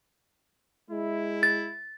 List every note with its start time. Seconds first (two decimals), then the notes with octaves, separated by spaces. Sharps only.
0.91 G#3 E4
1.43 A6